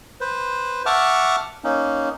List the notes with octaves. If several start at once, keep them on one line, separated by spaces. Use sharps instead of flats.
B4 C5
E5 F#5 A5 C#6 D6 F6
A#3 C#4 D#4